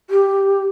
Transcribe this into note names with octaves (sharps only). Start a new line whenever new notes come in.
G4